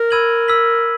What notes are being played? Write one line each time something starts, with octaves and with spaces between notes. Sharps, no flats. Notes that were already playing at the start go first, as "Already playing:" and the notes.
Already playing: A#4
B5 E6 G#6 D#7 F#7
E6 B6 F#7